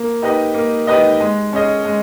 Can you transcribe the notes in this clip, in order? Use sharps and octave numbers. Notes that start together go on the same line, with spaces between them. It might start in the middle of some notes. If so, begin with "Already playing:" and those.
Already playing: A#3
D#4 G4 B4 D#5
A#3
D#4 G4 B4 D#5
G#3
C#4 G#4 D#5
G#3